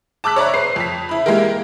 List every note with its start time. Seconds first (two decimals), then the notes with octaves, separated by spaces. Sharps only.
0.24 A5 D6 E6 F#6 B6
0.36 C#5 D5 E5 A#5
0.54 B4 C5 C7
0.76 F2 B6
1.09 E4 B5
1.26 G#3 A#3 E4 G4 A#4